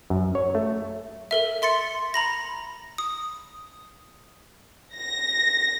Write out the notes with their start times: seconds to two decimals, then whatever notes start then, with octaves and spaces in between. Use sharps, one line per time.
0.10 F#2
0.35 C#5
0.55 A3
1.31 A4 A#4 E5
1.62 E5 C6 A6 C#7
2.14 A#5 B5 A#6
2.98 D#6
4.95 A#6